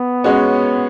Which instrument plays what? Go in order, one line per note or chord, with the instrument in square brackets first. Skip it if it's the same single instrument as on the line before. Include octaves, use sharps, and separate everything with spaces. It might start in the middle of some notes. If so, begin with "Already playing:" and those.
Already playing: [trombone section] B3
[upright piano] G#3 C#4 F#4 C#5